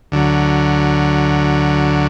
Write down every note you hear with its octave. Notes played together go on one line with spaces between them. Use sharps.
D2 D3 F#3